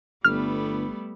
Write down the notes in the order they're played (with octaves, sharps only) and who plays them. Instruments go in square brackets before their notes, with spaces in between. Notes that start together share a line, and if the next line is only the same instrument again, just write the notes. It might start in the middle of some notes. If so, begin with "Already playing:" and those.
[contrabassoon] G1 [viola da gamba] G3 A3 B3 [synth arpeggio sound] F6